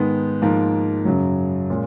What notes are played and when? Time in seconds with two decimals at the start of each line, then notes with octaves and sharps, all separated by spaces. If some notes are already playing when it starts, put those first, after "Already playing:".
Already playing: G#2 D#3 G#3 B3
0.42 G#2 F3 A#3
1.05 F#2 C#3 F#3
1.70 A#2 G#3 C#4